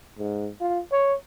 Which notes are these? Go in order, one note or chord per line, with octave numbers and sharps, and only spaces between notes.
G#2
F4
C#5